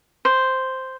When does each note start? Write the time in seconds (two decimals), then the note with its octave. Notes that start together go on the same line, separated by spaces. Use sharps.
0.25 C5